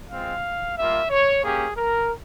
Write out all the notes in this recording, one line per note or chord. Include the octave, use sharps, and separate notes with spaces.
G#3 C4 F4 F5
G3 A#3 F4 E5
C#5
A#3 C#4 G4 G#4
A#4